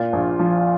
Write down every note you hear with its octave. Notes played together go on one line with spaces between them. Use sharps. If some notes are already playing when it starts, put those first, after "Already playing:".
Already playing: A#2 F4
A#1
F3